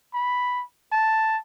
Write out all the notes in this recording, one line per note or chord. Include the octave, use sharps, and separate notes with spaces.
B5
A5